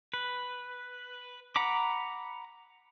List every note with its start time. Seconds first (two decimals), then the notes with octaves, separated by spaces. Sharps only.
0.14 B4
1.56 F#5 A#5 B5 D6